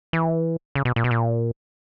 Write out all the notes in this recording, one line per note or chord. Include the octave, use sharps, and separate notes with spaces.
E3
C#3
B2
A#2
B2
A#2